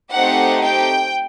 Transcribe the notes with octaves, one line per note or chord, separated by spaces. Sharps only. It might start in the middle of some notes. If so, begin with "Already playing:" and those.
A3 C4 D#4 G4 F#5
G5